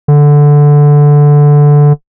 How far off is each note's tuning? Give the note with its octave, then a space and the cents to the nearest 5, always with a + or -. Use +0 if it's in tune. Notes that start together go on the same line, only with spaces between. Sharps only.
D3 -5